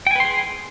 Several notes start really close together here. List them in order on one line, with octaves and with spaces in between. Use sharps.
G5 G#5 B4 C6 G#4